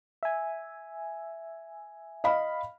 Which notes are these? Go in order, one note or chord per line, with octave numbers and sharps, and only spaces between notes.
E5 G#5
D#5 F5 B5